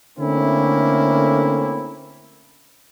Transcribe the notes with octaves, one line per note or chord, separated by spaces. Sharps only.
D3 A3 A#3 C4 C#4 E4